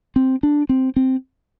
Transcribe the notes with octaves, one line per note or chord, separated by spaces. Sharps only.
C4
D4
C4
C4